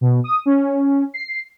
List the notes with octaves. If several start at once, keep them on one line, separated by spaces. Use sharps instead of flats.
B2
D#6
C#4
C7